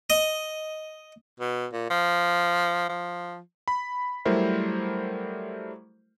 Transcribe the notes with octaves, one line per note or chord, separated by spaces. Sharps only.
D#5
B2
A#2
F3
F3
B5
F#3 G3 A3 E4 A#4 C5